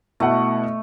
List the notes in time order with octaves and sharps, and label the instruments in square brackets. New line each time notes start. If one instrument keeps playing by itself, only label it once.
[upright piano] B2 E4 F#5 [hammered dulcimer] A3